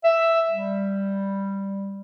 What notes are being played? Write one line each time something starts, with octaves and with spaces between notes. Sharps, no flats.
E5
G3